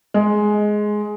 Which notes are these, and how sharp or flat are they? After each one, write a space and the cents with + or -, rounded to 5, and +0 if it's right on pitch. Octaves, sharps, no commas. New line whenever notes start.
G#3 +10